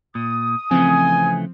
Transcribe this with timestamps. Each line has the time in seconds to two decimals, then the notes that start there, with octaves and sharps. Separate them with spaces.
0.15 A#2 D#6
0.71 C#3 E3 F3 A3 C4 G#5